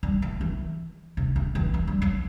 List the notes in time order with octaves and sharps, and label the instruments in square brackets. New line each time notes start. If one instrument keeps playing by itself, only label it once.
[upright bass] G3
E3
E3
C3
E3
E3
F#3
G3
F#3